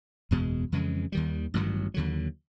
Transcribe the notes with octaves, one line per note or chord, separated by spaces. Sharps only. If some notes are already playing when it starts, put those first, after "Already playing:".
F#1 E2 B2 G#3
F2 C#3 E3 G#3
D#2 D#3 G3
A1 G2 D#3 F#3
D#2 D3 F#3